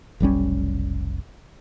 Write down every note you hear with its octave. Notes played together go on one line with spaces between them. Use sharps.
F1 B1 G3 C#4